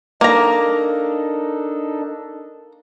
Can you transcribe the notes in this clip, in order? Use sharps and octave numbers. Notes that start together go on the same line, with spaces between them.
A#3 D4 D#4 A4 A#5